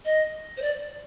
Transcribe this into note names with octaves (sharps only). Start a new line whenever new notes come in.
D#5
C5
D5